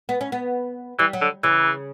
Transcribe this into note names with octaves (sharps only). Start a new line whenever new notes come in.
B3
C#4
B3
E3 G3
F#3
D3
C#3 E3